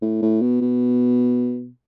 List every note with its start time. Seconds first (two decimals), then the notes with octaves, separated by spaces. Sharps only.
0.02 A2
0.22 A2
0.41 B2
0.61 B2